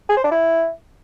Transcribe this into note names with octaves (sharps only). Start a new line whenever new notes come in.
G#4
C5
D4
E4